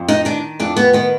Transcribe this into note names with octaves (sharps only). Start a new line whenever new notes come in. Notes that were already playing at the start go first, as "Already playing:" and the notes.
Already playing: F2
D#4
D#3 D4
F2 D4
B3
D#3 B3